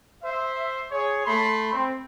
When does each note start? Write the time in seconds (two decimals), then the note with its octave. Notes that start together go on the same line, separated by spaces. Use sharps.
0.24 C5 E5
0.92 G#4 C#5
1.26 A3 B5 C6
1.73 C4